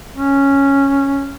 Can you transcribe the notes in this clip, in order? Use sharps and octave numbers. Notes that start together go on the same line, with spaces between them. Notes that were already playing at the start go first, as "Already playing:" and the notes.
C#4